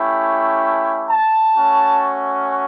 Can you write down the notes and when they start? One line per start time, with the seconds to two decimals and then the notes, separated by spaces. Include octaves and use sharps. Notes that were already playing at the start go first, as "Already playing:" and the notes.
Already playing: A3 C#4 E4 G4
1.09 A5
1.56 A3 C#4 F#4